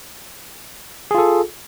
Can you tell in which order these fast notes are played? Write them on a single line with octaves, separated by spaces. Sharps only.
G#4 F4 A4